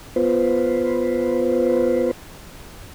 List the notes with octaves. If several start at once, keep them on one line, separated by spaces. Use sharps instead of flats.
B3 F4 B4 C5